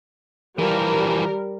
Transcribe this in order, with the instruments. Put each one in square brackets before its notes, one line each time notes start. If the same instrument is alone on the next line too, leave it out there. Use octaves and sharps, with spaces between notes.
[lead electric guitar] E3 F3 [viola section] G3 A#4